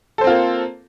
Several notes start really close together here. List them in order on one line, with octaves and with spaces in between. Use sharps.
A4 C5 C4 F4 A#3